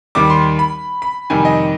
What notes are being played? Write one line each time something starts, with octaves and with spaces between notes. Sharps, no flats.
D#2 D#3 G3 D6
C6
B5
B5
F2 C3 D#3 G3 G#5
D#5